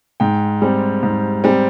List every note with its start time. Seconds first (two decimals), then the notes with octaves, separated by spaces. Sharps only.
0.20 G#2 G5
0.62 G3 C4
1.03 G#2
1.44 G3 C4